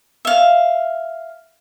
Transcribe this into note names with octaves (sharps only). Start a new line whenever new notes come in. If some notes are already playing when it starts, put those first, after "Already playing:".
E5 F5